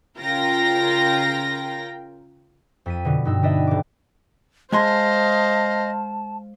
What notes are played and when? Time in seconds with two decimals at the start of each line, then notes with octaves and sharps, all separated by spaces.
0.18 C#3 F4 A#4 G5 A#6
2.86 F2 B6 D#7
3.05 B2 D3
3.25 G2 D#4 E6
3.42 G3 B3 D4 B4 D#5 E5
3.67 D#1 D6
4.72 G#3 C5 D#5 F5 G#5 A5 C6